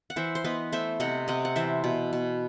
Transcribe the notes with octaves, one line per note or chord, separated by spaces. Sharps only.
F#5
E3 C5 E5
C5
B3 B4 D#5
A3 C5 E5
C3 D#5 F#5
C3 D#5 F#5
F#5
E3 C5 E5
B2
B2